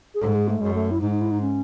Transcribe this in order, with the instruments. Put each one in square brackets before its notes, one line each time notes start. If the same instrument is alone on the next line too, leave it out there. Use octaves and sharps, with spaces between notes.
[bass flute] G#4
[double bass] G#2 [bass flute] A4
[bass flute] G#4
A3
[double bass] F#2 [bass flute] G#3
[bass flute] A3
E4
[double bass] G#2 [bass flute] D#4
[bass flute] D#4
E4
D#4
C#4